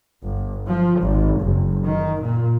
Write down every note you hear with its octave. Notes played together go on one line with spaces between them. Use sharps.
G1
F3
G#1
F#1
D#3
A#2